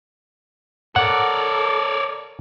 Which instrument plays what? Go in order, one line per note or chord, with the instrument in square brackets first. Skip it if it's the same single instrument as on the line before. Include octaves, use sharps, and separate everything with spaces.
[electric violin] A4 A#4 [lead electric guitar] C#5 D5 [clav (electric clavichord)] F#5